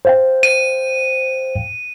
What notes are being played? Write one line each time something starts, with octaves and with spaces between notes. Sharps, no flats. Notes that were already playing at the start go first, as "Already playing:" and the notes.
C5 F5 G5
D#7